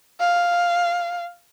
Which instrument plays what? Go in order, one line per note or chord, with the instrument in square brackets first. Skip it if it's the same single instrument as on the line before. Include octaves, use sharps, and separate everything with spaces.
[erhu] F5